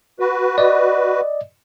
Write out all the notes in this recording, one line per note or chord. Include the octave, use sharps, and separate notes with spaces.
F#4 B4
D5 D#5